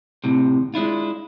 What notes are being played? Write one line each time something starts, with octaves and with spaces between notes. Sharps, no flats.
D2 A2 C3
G#3 D4 E4 F4